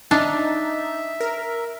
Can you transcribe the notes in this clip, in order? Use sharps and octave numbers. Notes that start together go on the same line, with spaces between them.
D4 D#4 E5
A#4